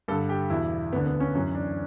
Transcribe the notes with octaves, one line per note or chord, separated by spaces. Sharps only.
G2 D3 A4
G4
E2 B2 E4
D2 D3 B3
B3
C#4
F#2 E3 C#4
D4